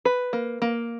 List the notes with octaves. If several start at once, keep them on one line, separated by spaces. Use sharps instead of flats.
B4
A#3
A#3